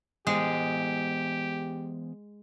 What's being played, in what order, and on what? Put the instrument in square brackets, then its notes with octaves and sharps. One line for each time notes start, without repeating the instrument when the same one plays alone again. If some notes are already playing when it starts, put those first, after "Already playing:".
[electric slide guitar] E3 B3 C5 [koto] G#3 [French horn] G4